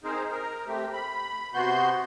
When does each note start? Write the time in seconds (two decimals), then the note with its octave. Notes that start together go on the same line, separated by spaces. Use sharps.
0.04 C4 D#4 G#4 A#4 C5
0.31 A#4
0.67 A3 C4 G4
0.93 B5
1.54 C3 B3 F#4 C6 G6